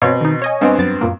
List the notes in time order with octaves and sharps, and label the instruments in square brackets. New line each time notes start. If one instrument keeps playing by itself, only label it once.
[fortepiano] B2 C4 [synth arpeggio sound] C#5
[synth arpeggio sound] D#3 D#4
C#5 D#5 G#5
[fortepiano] G2 B3 C4
[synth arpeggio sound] F#2 A6
F#2 A#2 A#3